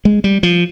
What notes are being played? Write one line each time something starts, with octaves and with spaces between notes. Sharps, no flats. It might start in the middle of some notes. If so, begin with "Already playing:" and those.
G#3
G3
F3